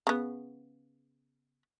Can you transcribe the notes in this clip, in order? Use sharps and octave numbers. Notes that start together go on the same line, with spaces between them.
C#3 B3